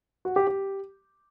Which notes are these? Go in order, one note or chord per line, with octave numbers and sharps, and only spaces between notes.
F#4
G4
G4